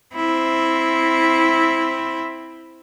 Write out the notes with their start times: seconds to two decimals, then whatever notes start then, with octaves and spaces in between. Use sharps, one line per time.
0.15 C4 E4